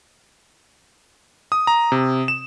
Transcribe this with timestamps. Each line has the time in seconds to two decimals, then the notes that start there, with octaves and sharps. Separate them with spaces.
1.52 D#6
1.67 A#5
1.92 C3
2.28 E7